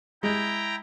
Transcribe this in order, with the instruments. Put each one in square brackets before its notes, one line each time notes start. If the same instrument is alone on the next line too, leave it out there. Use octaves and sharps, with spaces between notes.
[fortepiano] G#3 [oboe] E4 [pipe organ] G5 A#5